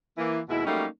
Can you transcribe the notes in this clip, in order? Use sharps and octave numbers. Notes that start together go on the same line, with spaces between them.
E3 A#3
D#2 B2 G#3 E4
F#3 G3 A3 A#3 C#4 D#4